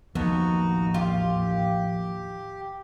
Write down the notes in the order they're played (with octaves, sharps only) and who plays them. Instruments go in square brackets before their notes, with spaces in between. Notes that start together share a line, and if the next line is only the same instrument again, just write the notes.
[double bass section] A1 D#2 A2 [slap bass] F3 A#3 [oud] B3 [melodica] D#4 F#4
[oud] F4 [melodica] G4